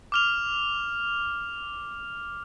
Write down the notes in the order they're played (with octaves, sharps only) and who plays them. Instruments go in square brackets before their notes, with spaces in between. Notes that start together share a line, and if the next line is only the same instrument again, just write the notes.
[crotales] D6 F6 F7